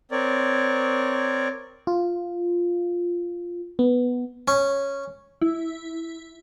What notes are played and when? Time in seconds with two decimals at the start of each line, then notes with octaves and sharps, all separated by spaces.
0.12 C4 A#4 C#5 D5
1.87 F4
3.79 B3
4.48 C#4
5.42 E4